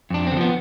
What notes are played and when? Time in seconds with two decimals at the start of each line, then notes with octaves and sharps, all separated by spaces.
0.10 F2 D4
0.27 D3 C4
0.37 F3 B3